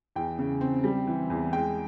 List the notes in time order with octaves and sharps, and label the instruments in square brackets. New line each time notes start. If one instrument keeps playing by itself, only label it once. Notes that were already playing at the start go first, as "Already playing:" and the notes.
[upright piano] E2 G5
C#3
C4
G3
E3
E2
G#3 G5